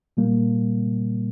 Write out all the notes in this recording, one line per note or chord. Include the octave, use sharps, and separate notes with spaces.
A#2 G3 A#3